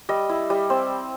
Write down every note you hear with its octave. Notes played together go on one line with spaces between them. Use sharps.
G3 D#5
E4
G3
C4